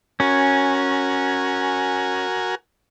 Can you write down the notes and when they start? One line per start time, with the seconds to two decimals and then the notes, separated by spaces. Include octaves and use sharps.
0.20 C#4 F#4 A#4 G#5